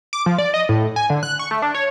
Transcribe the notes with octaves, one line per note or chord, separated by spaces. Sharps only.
D6
F3
D5
D#5
A2
G#5
D3
F#6
C#6
A3
D4
C#5